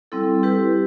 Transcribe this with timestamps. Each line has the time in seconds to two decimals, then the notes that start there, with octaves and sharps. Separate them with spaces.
0.12 G3 C4 E4 A4
0.43 E4 G4 B4